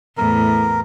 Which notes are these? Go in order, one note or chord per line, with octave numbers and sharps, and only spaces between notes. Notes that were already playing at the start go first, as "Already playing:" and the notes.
E2 A2 A#4